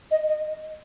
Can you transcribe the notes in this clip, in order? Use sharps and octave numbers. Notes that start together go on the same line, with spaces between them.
D#5
D#5